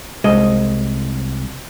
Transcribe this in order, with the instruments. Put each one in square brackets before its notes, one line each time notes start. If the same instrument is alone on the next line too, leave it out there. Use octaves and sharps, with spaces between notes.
[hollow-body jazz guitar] C2 G#3 D#5